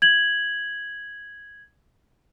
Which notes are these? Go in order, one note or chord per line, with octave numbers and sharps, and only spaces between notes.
G#6 F#7